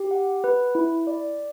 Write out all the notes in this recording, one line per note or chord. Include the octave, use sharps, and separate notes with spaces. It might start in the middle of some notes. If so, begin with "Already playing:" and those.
Already playing: G4
F#5
B4
E4
D5